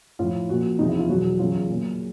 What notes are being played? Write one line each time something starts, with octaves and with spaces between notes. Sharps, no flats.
A2 F3 F4
A#2 F3 F#4
E2 C3 F3 D#4
E4
F4
E2 B2 F#3 F#4
E2 C#3 F#3 F4
A#2 F#3